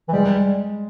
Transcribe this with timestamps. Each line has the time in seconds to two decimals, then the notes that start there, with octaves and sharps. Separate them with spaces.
0.08 E3
0.13 G3 G#3